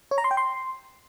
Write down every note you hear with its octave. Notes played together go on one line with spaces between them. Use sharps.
C#5
A#5
C6
G5
C6